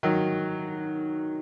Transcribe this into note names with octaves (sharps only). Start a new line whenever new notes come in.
D#3 F#3